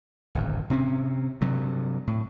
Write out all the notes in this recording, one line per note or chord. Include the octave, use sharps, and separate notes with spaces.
D1 G#1 F#2
C3 C4 C#4
G2 C3 F#3
A2